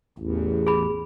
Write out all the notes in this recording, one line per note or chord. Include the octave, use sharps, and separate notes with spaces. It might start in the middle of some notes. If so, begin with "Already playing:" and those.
A1 E2
G#4 B5